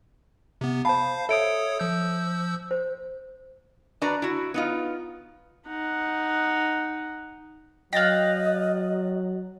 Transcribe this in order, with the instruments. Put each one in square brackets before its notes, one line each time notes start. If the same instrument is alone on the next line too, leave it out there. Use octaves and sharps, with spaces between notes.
[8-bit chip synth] C3 B3
[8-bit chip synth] C5 F5 [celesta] A5 B5
[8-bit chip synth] A4 C#5 D#6 [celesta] E5 D7
[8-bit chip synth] F3 E6 G6
[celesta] C5
[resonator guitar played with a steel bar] D4 F#4 B4 D5 A#5
E4 F#4
B3 D#4 F4
[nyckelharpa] D#4 F#5
[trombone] F#3 [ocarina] D#5 [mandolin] F5 G5 [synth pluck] F#6 A6 A#6